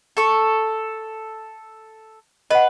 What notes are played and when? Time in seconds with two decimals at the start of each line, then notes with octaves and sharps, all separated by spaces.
0.17 A4 C#6
2.51 B4 D#5 F#5